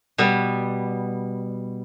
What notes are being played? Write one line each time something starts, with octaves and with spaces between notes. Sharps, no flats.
B2 G3 B3